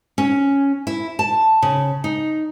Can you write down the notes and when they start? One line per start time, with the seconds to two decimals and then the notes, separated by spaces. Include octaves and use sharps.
0.18 C#4
0.87 E4
1.19 A5
1.62 C#3
2.04 D#4